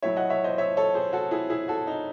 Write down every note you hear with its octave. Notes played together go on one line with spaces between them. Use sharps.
A2 F#3 A3 C#5 E5
D#5 F#5
C#5 E5
C5 D#5
C#5 E5
A4 C#5
G#4 C5
F#4 A4
E4 G#4
E4 G#4
F#4 A4
D#4